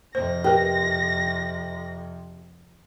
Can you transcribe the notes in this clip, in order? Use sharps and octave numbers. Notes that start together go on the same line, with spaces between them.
F2 C3 C5 A#6
G4 A#4 B4